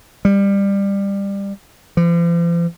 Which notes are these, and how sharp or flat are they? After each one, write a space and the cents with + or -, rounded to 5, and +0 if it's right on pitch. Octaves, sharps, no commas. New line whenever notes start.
G3 +20
F3 -45